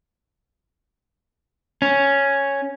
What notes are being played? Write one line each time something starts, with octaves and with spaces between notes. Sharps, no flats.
C#4